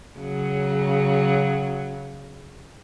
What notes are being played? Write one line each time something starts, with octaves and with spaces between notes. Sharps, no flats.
C#3 F#3